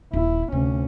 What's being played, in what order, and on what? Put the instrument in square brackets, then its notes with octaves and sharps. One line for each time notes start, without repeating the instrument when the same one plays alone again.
[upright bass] D#1 [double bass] E4
[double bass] D2 C#4 [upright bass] C3